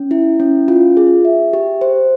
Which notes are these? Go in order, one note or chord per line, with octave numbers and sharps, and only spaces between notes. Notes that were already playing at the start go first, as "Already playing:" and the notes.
Already playing: C#4
E4
C#4
F4
G#4
E5
G4
C5